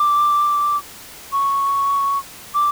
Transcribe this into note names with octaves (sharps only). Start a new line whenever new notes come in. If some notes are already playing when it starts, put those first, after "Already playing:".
Already playing: D6
C#6
D6